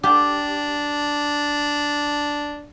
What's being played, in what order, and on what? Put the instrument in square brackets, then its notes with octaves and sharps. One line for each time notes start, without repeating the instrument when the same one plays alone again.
[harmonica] D4 [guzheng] G4